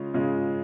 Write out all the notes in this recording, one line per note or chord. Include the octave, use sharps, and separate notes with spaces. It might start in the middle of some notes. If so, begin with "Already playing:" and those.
Already playing: C#3 G#3 C#4 F4
C#3 G#3 C#4 F4